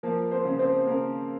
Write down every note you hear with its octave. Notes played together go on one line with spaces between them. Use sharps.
F3 A#3 A#4
C4 C5
C#3
C4 C5
C#3 A#3 A#4